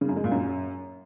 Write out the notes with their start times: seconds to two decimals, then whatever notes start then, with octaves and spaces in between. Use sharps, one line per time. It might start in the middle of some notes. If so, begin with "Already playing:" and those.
0.01 C#3
0.09 F#2
0.16 G#3
0.24 A#2
0.32 F#2